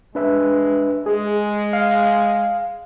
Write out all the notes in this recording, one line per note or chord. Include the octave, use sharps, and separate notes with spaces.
G#3 D4 B4 E5
G#3 G#4
F5